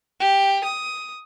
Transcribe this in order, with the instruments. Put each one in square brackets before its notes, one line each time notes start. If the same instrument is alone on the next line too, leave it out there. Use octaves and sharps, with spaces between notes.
[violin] G4
D#6